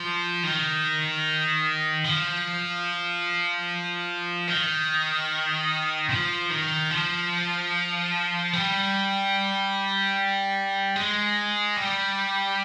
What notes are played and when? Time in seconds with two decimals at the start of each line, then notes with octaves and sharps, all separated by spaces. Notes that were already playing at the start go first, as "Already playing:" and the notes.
Already playing: F3
0.43 D#3
2.04 F3
4.48 D#3
6.10 F3
6.50 D#3
6.91 F3
8.53 G3
10.96 G#3
11.77 G3